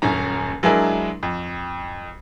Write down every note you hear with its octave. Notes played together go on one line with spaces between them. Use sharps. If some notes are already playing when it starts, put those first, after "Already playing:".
D#1 F#2 C#4 A#5
F#3 G#3 D4 E4 G#4 A#4
F2